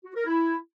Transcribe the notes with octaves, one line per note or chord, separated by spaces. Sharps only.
F#4
A#4
E4